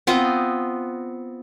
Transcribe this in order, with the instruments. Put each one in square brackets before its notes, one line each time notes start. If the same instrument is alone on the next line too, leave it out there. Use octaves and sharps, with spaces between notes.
[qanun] B3 C4 F4 D#5